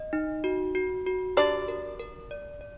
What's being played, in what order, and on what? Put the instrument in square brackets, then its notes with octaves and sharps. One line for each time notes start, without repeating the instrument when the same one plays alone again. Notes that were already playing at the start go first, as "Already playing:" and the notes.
Already playing: [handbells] D#5
D#4
F#4
F#4
F#4
[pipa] D4 D5 [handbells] G4
[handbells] A#4
A#4
D5
D5